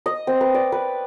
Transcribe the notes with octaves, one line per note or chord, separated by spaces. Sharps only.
D#5
C4
B4
D5
B4